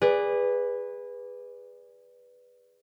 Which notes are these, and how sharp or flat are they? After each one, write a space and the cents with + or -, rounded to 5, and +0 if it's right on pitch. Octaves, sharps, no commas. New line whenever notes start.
G#4 -25 B4 +0 D5 -5